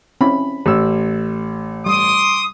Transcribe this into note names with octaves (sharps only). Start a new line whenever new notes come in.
C4 C#4 E4 B5
A1 E6
G3 C6 D6 D#6